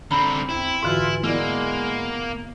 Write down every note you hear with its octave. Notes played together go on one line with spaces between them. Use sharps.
D3 C4 A#5 B5
E2 C4 E4
G#2 D3 E3 F4 F#4
G#3 A#3 B3 E4 D5